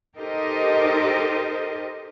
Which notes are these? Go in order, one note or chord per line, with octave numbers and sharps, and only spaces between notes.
D#4 G4 A4 A#4 C5 D#5